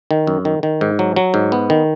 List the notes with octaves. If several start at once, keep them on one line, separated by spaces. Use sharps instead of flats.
D#3
F#2
D#3
D#3
G#2
F#3
F#3
G#2
B3
D#3